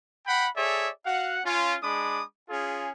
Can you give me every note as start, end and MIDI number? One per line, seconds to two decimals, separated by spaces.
0.27 0.48 78
0.27 0.48 79
0.27 0.48 83
0.56 0.89 68
0.56 0.89 69
0.56 0.89 73
0.56 0.89 74
0.56 0.89 76
1.05 1.40 66
1.05 1.40 77
1.05 1.40 78
1.45 1.75 61
1.45 1.75 65
1.82 2.23 56
1.82 2.23 62
1.82 2.23 83
1.82 2.23 86
1.82 2.23 87
2.49 2.91 61
2.49 2.91 65
2.49 2.91 68